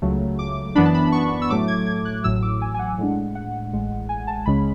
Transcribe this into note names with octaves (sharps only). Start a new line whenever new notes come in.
C#2 C#3 F#3 A3
D6
F#2 E3 B3 D4 B5
A5
B5
C#6
E6
A2 F#3 A3 D6
G#6
G#6
F#6
A1 A2 F#3 E6
E6
D6
G#5
G#5
F#5
A2 G#3 D4
F#5
A1 A2 G#3
G#5
A5
C#2 C#3 G#3 C#4 B5